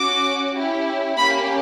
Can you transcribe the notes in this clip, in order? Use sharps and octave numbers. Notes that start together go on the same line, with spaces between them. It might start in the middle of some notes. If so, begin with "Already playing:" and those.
Already playing: C#4 F#4 D6
C#4 E4 G4
A#3 C#4 G4 B5